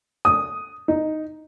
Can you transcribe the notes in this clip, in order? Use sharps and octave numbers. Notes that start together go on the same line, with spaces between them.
D#6
D#4